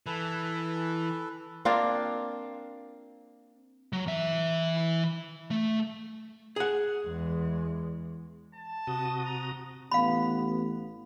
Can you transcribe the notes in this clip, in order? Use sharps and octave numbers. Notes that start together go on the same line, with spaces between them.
E3 A4 B4
A#3 C4 D4 F4
F#3
E3 E5
A3
G#4 F#5
E2 G#3
A5
C3 F#4 D#6
A#5
A1 B3 F5 B5